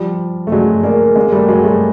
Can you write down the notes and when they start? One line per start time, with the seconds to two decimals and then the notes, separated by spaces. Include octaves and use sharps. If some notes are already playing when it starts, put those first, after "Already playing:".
Already playing: F3 G3
0.47 A3
0.52 F#3 G#3
0.83 G#3 A#3
1.16 G#3 A#3
1.32 G3 A3
1.49 F#3 G#3
1.64 G3 A3